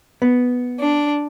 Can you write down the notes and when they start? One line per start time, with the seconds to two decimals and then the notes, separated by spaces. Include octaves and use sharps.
0.22 B3
0.78 D4